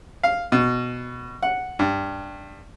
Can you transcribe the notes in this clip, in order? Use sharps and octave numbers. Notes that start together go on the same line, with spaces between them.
F5
B2
F#5
G2